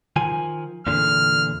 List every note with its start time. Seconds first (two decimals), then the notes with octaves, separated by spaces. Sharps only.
0.16 D#3 F3 G#5
0.87 E2 A#2 D3 F6